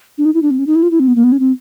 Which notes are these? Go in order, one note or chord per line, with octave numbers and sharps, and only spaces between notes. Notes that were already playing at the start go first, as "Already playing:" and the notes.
D4
D#4
E4
D4
C4
C#4
D#4
E4
F4
E4
C4
B3
A#3
B3
C#4
C4